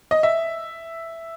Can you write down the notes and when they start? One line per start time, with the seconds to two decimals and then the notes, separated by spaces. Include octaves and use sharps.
0.11 D#5
0.23 E5